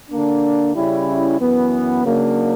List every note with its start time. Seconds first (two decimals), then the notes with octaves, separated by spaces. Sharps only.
0.10 D3 A#3 D4
0.74 C#3 G3 C#4 E4
1.38 F#2 E3 B3
2.03 C#3 F#3 A#3 D4